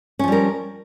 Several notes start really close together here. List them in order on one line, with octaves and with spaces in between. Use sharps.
C#4 F3 G3 A#4